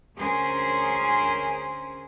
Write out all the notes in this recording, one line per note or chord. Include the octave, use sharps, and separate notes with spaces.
D2 C#4 G#4 A#4 C5